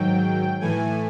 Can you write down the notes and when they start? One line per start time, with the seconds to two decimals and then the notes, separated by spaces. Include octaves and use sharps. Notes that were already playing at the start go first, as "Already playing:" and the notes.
Already playing: G#2 D#3 F#3 G5
0.61 A2 E3 A3 G#5